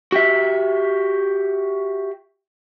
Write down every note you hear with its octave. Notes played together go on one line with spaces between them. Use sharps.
F#4 G4 E5